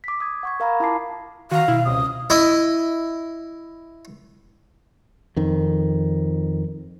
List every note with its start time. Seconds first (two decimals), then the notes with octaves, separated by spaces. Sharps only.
0.04 D6 B6
0.20 D#6 G#6
0.43 F#5 C#6 G#6
0.60 A#4 F5 A#5 B5
0.80 E4 F4 F5 A5 D6 C7
1.51 D#3 F#4 F5 A#5
1.68 B2 E4
1.85 C#2 C3 D#6
2.30 E4 D#5
5.36 F2 D#3